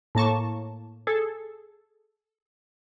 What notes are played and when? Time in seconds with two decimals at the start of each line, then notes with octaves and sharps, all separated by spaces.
0.15 A2 A#3 A5 C#6
1.07 G#4 A4